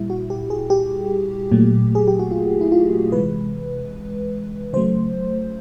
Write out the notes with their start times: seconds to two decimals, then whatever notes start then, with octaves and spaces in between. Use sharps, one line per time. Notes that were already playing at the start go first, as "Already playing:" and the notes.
Already playing: A#2 G3 E4
0.10 F#4
0.30 G4
0.50 G#4
0.70 G4
1.51 A#2 F#3 A3
1.95 G#4
2.08 G4
2.19 F#4
2.31 F4
2.61 E4
2.72 F4
3.12 C3 E3 G#3 B4
4.73 C#3 F#3 A3 C5